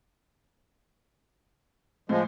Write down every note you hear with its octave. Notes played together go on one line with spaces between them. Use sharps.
A2 F3 G#3